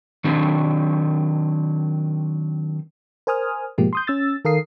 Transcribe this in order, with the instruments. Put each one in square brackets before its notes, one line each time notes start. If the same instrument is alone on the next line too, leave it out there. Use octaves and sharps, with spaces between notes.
[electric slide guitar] D#3 F#3 C4 D4
[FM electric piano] A#4 C5 G#5 D#6 F6
G#2 B2 F3 G#3 A#3 G4
C6 D#6 G6
C#4 E6 A6
D#3 A4 A#4 F5 D#6 C7